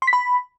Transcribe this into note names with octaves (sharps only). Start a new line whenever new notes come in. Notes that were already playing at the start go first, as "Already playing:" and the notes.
C6
B6
B5